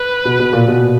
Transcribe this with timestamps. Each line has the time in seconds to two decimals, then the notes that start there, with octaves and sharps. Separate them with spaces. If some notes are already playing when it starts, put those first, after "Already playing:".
Already playing: B4
0.25 B2
0.40 B2
0.53 A#2
0.68 B2